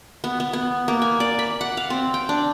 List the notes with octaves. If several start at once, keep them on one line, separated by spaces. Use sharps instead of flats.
B3
B3
B3
A#3
G#5
D5
B5
F#5
F5
C4
G5
D4